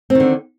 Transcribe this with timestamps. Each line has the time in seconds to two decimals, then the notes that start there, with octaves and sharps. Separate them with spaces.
0.10 C4
0.15 D#3
0.20 D3